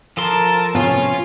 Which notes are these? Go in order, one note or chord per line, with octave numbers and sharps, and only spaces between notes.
F3 A4 A#4 A5 C6
A2 C3 B3 C#4 F4